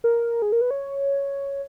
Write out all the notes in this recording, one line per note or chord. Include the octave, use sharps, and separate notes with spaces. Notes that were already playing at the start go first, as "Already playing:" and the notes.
A#4
G#4
A#4
B4
C#5